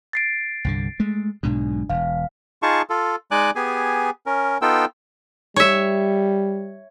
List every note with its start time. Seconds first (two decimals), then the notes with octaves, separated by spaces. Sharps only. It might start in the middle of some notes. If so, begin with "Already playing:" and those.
0.13 A6 C7 D7
0.64 C2 G2 D3
1.00 G#3 A3
1.43 B1 G#2 B2 D4
1.90 E1 F5
2.63 D#4 F4 G#4 A5 C#6
2.90 F4 A4
3.31 G#3 D#4 D5 G#5 D6 F#6
3.55 B3 G4 G#4 G#5
4.26 C#4 A#4
4.62 B3 D#4 F4 A4 G5 E6
5.56 G3 C#5 E5